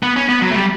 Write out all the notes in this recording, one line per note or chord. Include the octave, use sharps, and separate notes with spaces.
B3
C#4
B3
F#3
A3
G3